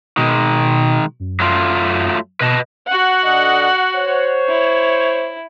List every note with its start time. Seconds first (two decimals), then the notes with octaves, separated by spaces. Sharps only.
0.17 B2 D#3 G#3
1.20 F#2
1.40 F#3 A3 F4
2.40 B2 B4 D#5 A5
2.87 F#4 F#5
3.24 D3 D5 D#5
3.96 C5 C#5
4.49 E4